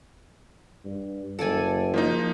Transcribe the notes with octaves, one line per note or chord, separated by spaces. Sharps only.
G2
F#1 A4 D5 G#5
F3 A#3 D#4